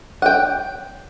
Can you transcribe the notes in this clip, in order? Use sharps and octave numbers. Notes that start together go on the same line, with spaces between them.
F#5 G5